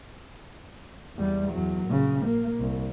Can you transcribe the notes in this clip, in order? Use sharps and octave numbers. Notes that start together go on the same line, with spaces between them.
E2 G3
E2 F#3
A#1 C#3
A#3
C2